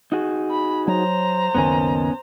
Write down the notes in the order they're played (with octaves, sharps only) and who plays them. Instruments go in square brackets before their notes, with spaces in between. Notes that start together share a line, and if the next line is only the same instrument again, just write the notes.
[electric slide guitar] D#4 F#4 G#4
[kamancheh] B5
[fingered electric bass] F#3 [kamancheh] C5 A#5
[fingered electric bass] F#1 C#2 D#3 [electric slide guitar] B3 C#4 G#5